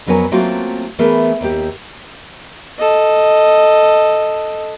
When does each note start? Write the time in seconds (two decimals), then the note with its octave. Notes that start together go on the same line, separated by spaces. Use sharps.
0.07 F2 F#3 B3 A#4 C#5 G#5
0.31 F#3 A3 A#3 C4 F4 F#4
0.99 E3 A3 B3 G#4 A#4
1.41 D#2 G4
2.78 A4 D#5